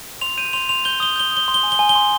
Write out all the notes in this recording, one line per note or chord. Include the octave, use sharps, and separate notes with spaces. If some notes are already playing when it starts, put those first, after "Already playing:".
C6 F7
G6 D#7
C6 F7
C6 F7
G6 G7
D#6 G7
G6 G7
D#6 G7
C6
G7
G#5
G7
G#5
G7
C6